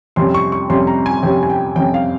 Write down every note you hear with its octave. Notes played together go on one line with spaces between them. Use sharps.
F2 C3 G3 C#4 C6
C#6
C#6
F2 C3 G3 C#4 C6
A#5
G#5
F2 C3 G3 C#4 G5
G#5
G5
F2 C3 G3 C#4 G5
F5